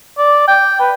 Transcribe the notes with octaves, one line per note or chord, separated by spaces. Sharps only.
D5
G5
B4